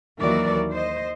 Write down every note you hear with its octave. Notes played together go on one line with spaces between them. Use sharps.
D#2 E3 F#3 F#4 A#4 D5
C5 D#5